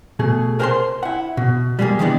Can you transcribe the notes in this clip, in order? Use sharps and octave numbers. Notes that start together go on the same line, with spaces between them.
B2 A3 G#4
A#4 C5 F#5 G5 A5 C6
E4 F#5
B2
G3 G#3 A#3 G#4
D#3 E3 G#3 B3 D4 E4